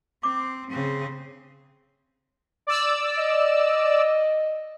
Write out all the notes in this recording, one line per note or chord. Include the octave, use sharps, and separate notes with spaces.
C4 D6
C#3 C4
D5 E6
D#5